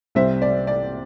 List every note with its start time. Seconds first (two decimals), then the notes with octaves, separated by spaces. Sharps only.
0.15 C2 C3 G3 C4 C5 E5
0.42 D5
0.67 D5